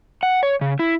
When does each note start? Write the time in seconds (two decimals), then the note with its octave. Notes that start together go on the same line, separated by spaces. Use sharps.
0.23 F#5
0.43 C#5
0.61 C#3
0.79 E4